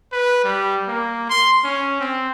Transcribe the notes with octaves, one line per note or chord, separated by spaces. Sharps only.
B4
G3
A#3
C6
C#4
C4